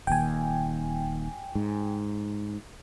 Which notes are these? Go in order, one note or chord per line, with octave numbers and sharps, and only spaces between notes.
D#1 D#2 G5 G#5
G#2